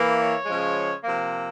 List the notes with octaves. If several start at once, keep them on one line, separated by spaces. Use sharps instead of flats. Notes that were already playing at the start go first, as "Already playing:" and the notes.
Already playing: E3 A#3
C#5
C#3 F3 G#3
C3 F3 A#3